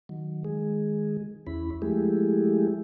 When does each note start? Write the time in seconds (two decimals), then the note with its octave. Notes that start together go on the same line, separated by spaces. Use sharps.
0.09 D#3 F#3
0.44 D#3 G#3 G#4
1.47 E2 C#4 E4 B5
1.82 F3 G#3 A3 E4 G4 G#4